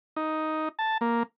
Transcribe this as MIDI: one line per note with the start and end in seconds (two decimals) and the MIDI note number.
0.16 0.69 63
0.79 0.98 81
1.01 1.23 58